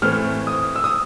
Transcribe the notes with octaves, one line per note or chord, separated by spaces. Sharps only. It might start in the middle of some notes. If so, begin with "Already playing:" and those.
A2 E3 A3 C4 F6
D#6
E6
D#6